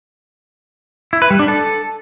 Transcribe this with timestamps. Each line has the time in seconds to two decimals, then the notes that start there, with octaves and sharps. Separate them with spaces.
1.13 E4
1.22 B4
1.31 G3
1.39 D4
1.48 A4